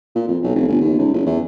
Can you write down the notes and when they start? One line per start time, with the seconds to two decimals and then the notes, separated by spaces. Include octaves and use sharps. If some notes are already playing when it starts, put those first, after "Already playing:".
0.15 A#2
0.28 F2
0.43 B1
0.55 F1
0.68 G1
0.81 D#2
0.99 C#2
1.14 F#1
1.26 E2